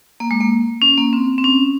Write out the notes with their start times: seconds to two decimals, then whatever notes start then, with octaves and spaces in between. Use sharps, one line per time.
0.20 A#3
0.31 G#3
0.40 A#3
0.82 C#4
0.97 A#3
1.13 C4
1.38 C4
1.44 C#4